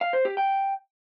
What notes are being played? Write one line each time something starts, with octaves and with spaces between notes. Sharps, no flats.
F5
C5
G4
G5